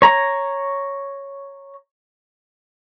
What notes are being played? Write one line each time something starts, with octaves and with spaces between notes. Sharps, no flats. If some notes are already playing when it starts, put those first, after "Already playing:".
C#5 A#5